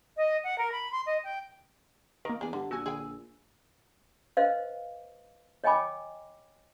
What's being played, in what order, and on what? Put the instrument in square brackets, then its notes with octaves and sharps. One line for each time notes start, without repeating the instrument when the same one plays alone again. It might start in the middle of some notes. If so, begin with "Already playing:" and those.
[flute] D#5
F#5
A#4
B5
C6
D#5
G5
[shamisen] D#3 [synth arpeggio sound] A#3 A#4
[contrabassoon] E2 [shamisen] D4 G#4
[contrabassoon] G2 [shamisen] D3 [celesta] G4 F#5
[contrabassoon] A#1 [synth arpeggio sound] F#4 F#5 G#5 [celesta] E6
[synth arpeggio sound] D3 [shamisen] G#4 G5 G#5
[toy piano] B4 C5 D#5 F5
C#5 D#5 G5 G#5 B5 D6